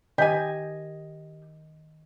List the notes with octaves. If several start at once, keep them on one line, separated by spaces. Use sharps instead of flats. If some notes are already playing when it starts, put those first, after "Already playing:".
D#3 G4 D#5 G#5